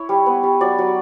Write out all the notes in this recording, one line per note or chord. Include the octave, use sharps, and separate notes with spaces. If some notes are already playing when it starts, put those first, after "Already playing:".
Already playing: E4 C#5
G3
B3
G3
F#3 D5
F#3